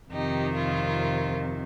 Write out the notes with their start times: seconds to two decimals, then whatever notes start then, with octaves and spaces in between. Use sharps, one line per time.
0.11 F2 C3 D#3 D#4 G4
0.54 F4 A#4